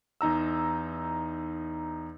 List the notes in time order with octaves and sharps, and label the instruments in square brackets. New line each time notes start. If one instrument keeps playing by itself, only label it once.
[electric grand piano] E2 D#4 A#5 E6